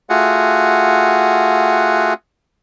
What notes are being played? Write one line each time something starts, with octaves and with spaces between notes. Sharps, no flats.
A3 F4 F#4 G#4 F#5